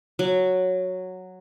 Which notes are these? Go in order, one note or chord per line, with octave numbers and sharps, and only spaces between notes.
F#3